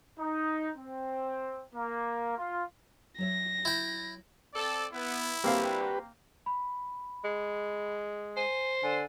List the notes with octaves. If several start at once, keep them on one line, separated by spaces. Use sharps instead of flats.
D#4
C4
A#3
F4
F#3 C#5 E5 A#6
E4 G5
C4 A4 D5
B3 E4
G3 A#3 C4 D4 F#4 G4 B4 F5
B5
G#3
C5 G#5 D#7
D3 G#5